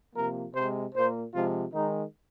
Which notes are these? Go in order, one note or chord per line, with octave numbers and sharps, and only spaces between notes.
C3 F3 A#3 A#4
C3 G#3 C5
A#2 A#3 C5
C3 F3 G#3 F4
D#3 G#3 D#4